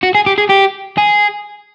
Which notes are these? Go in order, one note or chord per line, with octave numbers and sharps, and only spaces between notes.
F#4
G#4
G4
G#4
G4
G#4